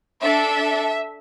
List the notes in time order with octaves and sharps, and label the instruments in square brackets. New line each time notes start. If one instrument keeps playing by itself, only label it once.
[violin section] D4 A4 E5